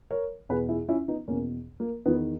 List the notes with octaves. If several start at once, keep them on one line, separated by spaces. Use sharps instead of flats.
A#4 C#5
E2 B2 G#4 B4
E4 G#4
C#4 E4
B3 D#4
E2 B2 A#3 C#4
A#3
E2 D#3 B3